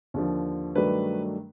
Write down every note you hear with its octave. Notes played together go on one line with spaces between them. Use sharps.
D#2 D3 F3
G2 D#3 F#3 A3 D4 B4